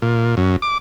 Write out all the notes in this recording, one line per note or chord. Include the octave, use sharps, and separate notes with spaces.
A#2
F#2
D6